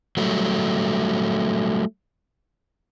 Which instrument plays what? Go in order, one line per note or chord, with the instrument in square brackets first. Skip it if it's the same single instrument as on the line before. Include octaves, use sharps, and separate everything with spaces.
[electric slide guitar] F#3 G3 A3